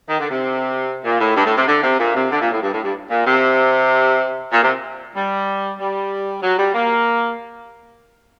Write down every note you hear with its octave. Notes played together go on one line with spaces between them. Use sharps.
D#3
D3
C3
A#2
A2
G2
A2
C3
D3
C3
A#2
C3
D3
A#2
A2
G2
A2
G2
A#2
C3
A#2
C3
G3
G3
F#3
G3
A#3